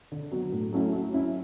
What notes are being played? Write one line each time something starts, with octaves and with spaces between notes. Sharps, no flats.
D3
F#3 B3 F#4
A2
F#3 A3 C#4 E4
F#3
C#4 E4